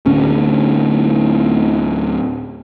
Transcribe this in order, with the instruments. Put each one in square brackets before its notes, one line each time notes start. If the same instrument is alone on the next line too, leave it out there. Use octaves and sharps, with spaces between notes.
[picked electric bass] D1 D2 C#4